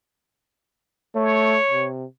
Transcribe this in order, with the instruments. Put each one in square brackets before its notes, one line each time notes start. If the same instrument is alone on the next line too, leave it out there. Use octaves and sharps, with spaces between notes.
[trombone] A3 [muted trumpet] C#5
[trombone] C3